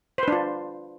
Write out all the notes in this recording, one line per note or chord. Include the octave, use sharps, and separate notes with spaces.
D4 F4 B4 C5